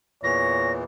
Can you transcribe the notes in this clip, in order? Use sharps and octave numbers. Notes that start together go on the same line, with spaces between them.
E2 A#2 E3 C#5 A#6